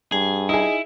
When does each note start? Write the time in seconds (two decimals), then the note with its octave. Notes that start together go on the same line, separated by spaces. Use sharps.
0.12 G2 G#4
0.49 D#4 E4 G#4